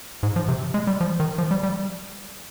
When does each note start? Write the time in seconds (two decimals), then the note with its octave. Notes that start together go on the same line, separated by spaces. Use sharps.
0.23 G#2
0.36 F3
0.48 C3
0.74 G#3
0.87 G3
1.01 F3
1.20 D#3
1.38 F3
1.51 G3
1.63 G3